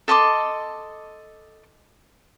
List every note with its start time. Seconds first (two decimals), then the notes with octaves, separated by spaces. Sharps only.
0.08 A4 D#5 C6 D6